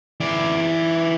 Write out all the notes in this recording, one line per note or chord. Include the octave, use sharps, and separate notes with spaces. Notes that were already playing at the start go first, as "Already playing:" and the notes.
E3 D5